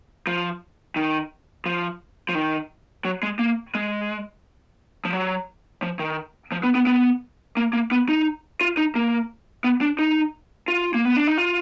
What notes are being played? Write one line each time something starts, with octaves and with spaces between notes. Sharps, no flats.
F3
D#3
F3
F3
D#3
F#3
G#3
A#3
G#3
F3
F#3
F3
D#3
F3
B3
B3
B3
A#3
A#3
B3
D#4
F4
D#4
A#3
B3
D4
D#4
F4
A#3
B3
D4
D#4
F4